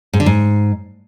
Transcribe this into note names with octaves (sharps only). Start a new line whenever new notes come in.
G#2
D3
G#2